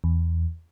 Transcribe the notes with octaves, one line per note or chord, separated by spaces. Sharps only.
E2